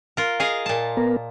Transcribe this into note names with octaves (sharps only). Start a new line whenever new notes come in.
F4 A#4
G#4 D#5 F5
A#2 A5
B3 A#4